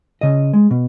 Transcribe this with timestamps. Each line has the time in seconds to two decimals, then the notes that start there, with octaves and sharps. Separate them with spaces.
0.21 C#3 D#5
0.53 G#3
0.71 B2